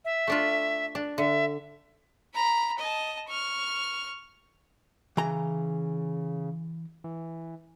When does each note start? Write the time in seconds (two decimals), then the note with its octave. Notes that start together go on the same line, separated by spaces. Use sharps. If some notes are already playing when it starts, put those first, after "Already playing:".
0.05 E5
0.27 A3 D4 F4
0.95 D4
1.18 D3 E5
2.34 A#5 B5
2.78 D#5 A5
3.28 C#6 F6
5.17 C#3 E3 A#5
7.04 E3